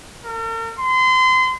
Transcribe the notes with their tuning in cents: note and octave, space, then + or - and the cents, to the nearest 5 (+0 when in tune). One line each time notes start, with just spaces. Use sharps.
A#4 -45
C6 -30